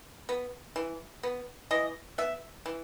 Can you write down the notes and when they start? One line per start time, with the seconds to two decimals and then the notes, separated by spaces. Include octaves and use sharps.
0.29 B3
0.76 E3
1.23 B3
1.71 E3 D#5
2.18 B3 E5
2.66 E3